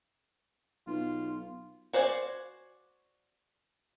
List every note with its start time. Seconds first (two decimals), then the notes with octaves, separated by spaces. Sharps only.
0.87 B1 F4
1.93 F#4 C5 D5 F#5 G#5